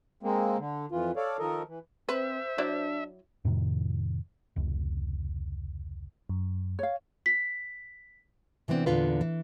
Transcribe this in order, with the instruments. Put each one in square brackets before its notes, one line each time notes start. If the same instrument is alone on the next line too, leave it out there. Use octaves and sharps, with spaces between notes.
[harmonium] G#3 A#3 C4
D3
F2 E3 F4
A4 C#5 D5 F5
D#3 F3 A4 A#4 D#5
E3
[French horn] C4 [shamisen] B4 [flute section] C5 [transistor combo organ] E5
[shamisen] F#3 E4 D5 [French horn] D4
[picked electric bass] F2 A2 C3 D#3
F1 C#2
[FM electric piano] F#2
[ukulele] C#5 F5
[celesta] B6
[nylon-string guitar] C3 E3 B3 C4 D4
E2 A#2 D3 F4 B4
E3